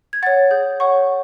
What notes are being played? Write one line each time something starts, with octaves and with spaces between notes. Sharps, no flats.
G#6
C#5 F#5 A6
G#4 G6
C#5 F#5 C#6